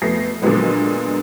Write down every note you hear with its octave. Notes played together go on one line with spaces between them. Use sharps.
F2 A3 B3 A#6 C7
A#2 D3 F3 F#3 G#3 B3